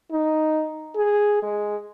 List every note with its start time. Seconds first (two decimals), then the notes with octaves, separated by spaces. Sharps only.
0.12 D#4
0.95 G#4
1.43 G#3